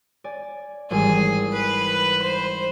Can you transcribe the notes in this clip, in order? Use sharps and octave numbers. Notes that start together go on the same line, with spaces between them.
D5 G#5
G#1 E3 G3 G#4
B4
C5